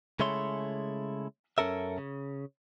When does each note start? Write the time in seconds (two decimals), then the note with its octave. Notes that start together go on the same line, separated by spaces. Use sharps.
0.20 C#3 G#3 A3 E4 C#5 C6
1.58 F#2 C#4 A4 A#4 E5
1.98 C#3